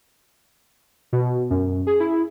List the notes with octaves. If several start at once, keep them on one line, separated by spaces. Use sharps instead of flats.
B2
F#2
G#4
E4